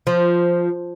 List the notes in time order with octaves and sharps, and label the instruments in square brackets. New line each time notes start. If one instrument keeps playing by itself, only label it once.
[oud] F3